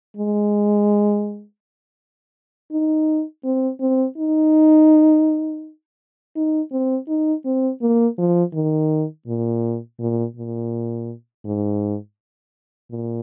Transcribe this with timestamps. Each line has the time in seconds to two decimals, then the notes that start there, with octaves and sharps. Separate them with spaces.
0.17 G#3
2.72 D#4
3.45 C4
3.80 C4
4.18 D#4
6.36 D#4
6.72 C4
7.08 D#4
7.45 C4
7.82 A#3
8.18 F3
8.54 D#3
9.27 A#2
10.00 A#2
10.36 A#2
11.45 G#2
12.91 A#2